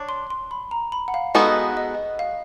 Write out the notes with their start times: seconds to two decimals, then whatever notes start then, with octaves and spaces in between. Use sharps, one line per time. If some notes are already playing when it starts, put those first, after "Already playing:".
Already playing: D4 C#5
0.09 C6
0.30 C6
0.51 B5
0.71 A#5
0.92 B5
1.08 F#5
1.14 F5
1.35 G#3 B3 D#4 F#4 A4 D#5
1.77 D#5
2.19 F5